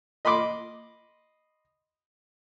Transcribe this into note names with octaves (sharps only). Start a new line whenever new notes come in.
D#5 B5 C6 D6